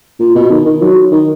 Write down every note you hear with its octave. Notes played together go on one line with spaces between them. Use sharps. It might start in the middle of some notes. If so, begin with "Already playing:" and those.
A#2
B2
D#3
D#3
F#3
D#3